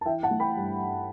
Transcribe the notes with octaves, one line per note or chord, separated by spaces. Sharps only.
A5
E3 E5 G5
F#5 A5
A3
G5 B5
G2
G2